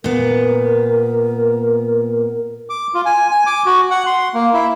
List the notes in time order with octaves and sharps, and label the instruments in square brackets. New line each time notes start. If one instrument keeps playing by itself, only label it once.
[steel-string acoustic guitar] A#2 B3 [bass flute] A#4
[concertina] D6
F4
G#5
G#5
D6
F#4
F#5
C6
A#3
E4